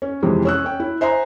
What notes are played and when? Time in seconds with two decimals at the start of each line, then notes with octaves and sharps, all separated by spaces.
0.02 C#4
0.22 F2 C3 E3 G#3
0.45 C#4 E6 F#6
0.64 C#4 G5
0.80 E4
1.01 C5 E5 G#5 A#5 C6